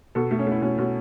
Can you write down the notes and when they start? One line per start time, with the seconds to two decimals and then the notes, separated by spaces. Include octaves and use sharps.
0.15 B2 A4
0.31 A3
0.39 C#4
0.47 A3 E4
0.62 B2 C#4
0.78 B2 C#4